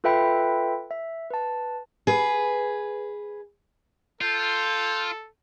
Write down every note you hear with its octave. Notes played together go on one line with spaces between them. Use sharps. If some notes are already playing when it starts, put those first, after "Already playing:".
F4 A4 B4 E5 G5 B5
E5
B4 A5
G#4 B4
F4 A4 G6